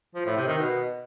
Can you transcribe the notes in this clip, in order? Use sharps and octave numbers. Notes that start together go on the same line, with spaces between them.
F3
A2
C3
D#3
B2